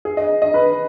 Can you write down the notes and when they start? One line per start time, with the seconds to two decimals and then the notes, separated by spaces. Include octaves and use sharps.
0.05 G#4
0.17 D#5
0.42 D#5
0.54 B4